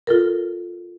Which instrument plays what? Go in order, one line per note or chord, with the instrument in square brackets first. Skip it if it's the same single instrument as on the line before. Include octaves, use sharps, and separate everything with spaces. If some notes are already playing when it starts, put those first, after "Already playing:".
[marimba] F4 A4 A#4